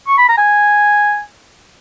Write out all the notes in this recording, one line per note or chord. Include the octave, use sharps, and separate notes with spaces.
C#6
B5
A#5
G#5